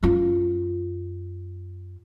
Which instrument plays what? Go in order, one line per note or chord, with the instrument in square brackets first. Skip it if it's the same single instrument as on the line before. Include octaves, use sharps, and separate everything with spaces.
[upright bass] F#2 F4